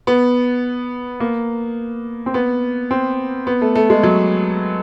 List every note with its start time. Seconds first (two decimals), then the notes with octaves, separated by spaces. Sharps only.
0.07 B3
1.20 A#3
2.26 C4
2.34 B3
2.91 C4
3.47 B3
3.62 A3
3.76 A3
3.90 G#3
4.03 F#3